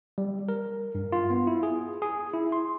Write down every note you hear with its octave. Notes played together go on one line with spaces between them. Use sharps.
G3
A#4
G2
F4
B3
E4
G#4
G#4
E4
C6